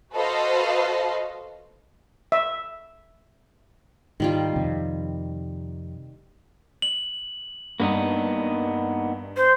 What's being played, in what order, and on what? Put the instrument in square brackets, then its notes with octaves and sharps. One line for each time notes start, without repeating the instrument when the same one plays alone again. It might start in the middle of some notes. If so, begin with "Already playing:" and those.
[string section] F#4 A4 B4 C5 D#5 F5
[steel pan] E5
[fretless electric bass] G#2 [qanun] D#3 G3 F4
[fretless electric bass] F2 C3
[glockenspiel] F#7
[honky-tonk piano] G2 [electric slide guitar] A#3 B3 D#4
[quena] C5